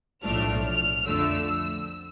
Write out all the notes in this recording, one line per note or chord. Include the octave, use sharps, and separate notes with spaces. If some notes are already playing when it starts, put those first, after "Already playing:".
B1 A2 F3 A3 D4 F6
F6
F2 D3 F3 A3 E6